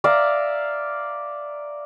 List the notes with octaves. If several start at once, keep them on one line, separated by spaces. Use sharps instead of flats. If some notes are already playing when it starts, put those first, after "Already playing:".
D5 E5 F5 A#5